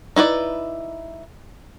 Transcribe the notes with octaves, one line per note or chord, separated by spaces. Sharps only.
D#4 E4 B4 D5